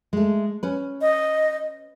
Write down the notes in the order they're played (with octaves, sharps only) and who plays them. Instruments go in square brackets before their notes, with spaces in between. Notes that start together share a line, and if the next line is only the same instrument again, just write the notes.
[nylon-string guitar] G#3 A3
C#4 B4
[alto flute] D#5